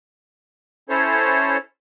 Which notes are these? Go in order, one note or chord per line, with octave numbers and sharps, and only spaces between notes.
C#4 E4 A4 C5 C#5